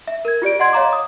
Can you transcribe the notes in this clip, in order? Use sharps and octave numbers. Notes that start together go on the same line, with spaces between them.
E5
A#4 G#6
F4 G4 D5 D7
D#5 F#5 C6 G#6
C#5 D#5 F5 A#5 C6 D6
D#6